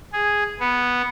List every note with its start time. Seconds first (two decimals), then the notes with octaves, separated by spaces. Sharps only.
0.13 G#4
0.60 B3